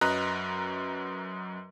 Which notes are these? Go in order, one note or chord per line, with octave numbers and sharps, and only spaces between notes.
F#2 F#3 B4 D#5 A#5 F#6